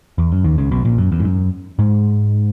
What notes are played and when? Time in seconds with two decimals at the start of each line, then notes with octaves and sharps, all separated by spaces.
0.18 E2
0.32 F#2
0.44 D#2 D#3
0.58 C#2 C#3
0.71 B1 B2
0.85 A#1 A#2
0.98 F#2
1.12 E2
1.20 G#2
1.25 F#2
1.79 G#2 G#3